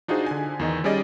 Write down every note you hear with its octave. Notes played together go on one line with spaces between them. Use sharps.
D4 D#4 F4 F#4 G#4 C5
D3 G#5
E2 D#3 D#5
G3 C#4 G#4 D5 D#5